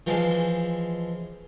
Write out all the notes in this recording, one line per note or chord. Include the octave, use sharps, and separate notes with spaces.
E3 F3 G#3